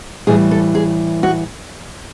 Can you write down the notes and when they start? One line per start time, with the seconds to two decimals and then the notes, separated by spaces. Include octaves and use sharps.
0.27 A2 E3 G3 G#4
0.51 A4
0.75 G#4
1.23 F#4